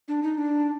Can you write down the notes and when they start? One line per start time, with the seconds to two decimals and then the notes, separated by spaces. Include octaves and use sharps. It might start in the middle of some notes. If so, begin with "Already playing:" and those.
0.08 D4
0.23 D#4
0.38 D4